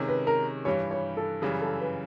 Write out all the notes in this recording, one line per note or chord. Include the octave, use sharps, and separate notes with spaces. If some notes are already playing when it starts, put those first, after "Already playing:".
Already playing: C3 D#3 G#3 C#4
B4
A#4
G2 E3 G3 C#5
C#5
A4
F#2 C#3 E3 G3 G#4
A4
B4